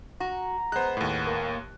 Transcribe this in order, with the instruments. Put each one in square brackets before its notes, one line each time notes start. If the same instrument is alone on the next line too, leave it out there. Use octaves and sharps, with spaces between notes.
[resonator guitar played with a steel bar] F#4 [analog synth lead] A#5
[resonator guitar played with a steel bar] G#3 B3 [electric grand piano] C5 F#6
[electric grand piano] D#2 A2
[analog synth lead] A#3